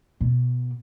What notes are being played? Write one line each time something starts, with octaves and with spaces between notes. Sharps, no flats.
B2